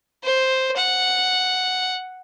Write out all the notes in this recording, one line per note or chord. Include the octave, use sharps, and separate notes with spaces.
C5
F#5